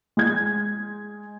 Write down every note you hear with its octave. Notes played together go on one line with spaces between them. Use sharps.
G#3 G#6